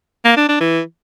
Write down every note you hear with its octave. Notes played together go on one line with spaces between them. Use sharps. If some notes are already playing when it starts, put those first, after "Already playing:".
A#3
D4
D4
E3